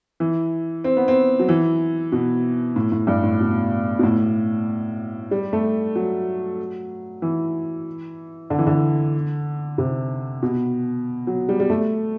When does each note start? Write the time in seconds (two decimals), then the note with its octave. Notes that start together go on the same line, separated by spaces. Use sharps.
0.20 E3
0.84 C4
0.97 B3
1.08 C4
1.40 F#3
1.49 E3
2.12 B2
2.76 A2
2.92 A2
3.07 G2
3.24 A2
3.40 B2
3.99 B2
4.03 A2
5.31 G3
5.53 A3
5.96 F#3
7.22 E3
8.50 D3
8.58 E3
8.67 D3
9.78 C3
10.43 B2
11.27 F#3
11.49 G3
11.60 G3
11.70 A3